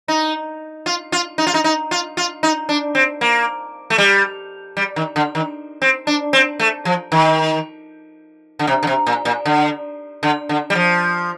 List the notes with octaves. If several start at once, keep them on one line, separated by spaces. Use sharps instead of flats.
D#4
F4
F4
D#4
F4
D#4
D#4
F4
F4
D#4
D4
C4
A#3
A3
G3
G3
D#3
D3
D#3
C4
D4
C4
A3
F3
D#3
D3
C3
D3
C3
A#2
A#2
D3
D3
D3
G3
F3